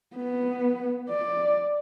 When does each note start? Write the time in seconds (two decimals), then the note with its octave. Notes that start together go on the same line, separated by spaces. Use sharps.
0.16 B3
1.10 D5